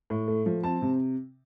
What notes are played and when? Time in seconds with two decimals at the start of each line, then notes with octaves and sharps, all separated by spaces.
0.10 A2
0.28 A3
0.46 F3
0.63 C4 A5
0.82 C3